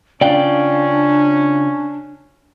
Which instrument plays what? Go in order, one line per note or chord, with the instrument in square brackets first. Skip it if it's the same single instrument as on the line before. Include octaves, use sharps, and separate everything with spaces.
[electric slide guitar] C#3 F4 [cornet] C#4 [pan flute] D4 [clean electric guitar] D5 G5